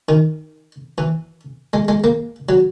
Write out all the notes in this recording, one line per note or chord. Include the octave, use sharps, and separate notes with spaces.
D#3
E3
G#3
G#3
A#3
F#3